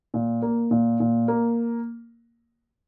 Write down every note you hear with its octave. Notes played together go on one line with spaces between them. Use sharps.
A#2
A#3
A#2
A#2
A#3